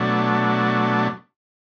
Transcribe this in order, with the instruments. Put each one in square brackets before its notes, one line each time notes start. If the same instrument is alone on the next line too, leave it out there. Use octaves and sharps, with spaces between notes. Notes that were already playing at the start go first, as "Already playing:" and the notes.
Already playing: [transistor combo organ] B2 F#3 A3 D4